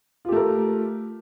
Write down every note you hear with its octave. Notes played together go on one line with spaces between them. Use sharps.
A3 F4 G4 A#4